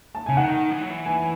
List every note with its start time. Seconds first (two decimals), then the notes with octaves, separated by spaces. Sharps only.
0.15 A5
0.26 C#3 G#5
0.37 D#3 F#5
0.72 E3
0.81 F#3
0.90 E3
1.06 G#5